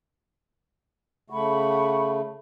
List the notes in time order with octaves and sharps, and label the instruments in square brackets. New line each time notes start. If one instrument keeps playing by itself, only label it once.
[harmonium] C#3 A3 [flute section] F#5 B5 C#6